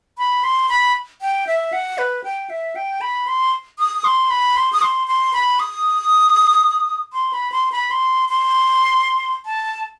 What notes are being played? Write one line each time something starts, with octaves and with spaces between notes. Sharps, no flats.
B5
C6
B5
G5
E5
F#5
B4
G5
E5
G5
B5
C6
D#6
C6
B5
C6
D#6
C6
C6
B5
D#6
C6
B5
C6
B5
C6
C6
A5